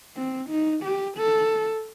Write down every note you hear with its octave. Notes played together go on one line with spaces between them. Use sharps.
C4
D#4
G4
A4